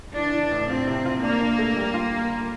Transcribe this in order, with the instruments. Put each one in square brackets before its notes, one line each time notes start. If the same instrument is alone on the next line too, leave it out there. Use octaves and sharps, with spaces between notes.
[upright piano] E3 [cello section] D4
[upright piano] E3
A2
[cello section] C4 [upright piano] F4
[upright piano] C3
F4
[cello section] A#3 [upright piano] D4
[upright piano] D4
A3
G3
F4